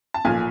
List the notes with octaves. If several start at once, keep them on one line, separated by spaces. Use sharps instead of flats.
A5
B1 A#2 F3 G#5